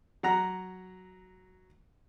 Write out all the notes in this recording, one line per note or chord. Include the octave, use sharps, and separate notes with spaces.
F#3 F#5 A#5